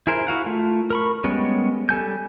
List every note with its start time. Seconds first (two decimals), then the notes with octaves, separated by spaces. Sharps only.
0.07 E4 G#4 A#4 C5
0.27 E4 F#4 F5 F#5
0.44 A3 F4
0.90 A#4 B5 C#6
1.24 G3 G#3 B3 C#4
1.89 G3 A4 G#5 G6